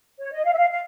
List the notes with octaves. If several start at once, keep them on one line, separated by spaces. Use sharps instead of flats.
C#5
D#5
F5
E5
F5
F5